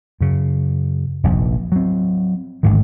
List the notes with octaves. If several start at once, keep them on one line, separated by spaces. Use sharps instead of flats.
F#2 C#3
F1 A#1 F2
F#3 C4
A1 G#2 D3 D#3